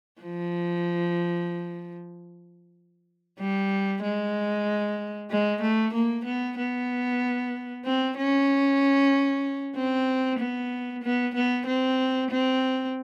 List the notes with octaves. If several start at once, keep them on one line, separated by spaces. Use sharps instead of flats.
F3
G3
G#3
G#3
A3
A#3
B3
B3
C4
C#4
C4
B3
B3
B3
C4
C4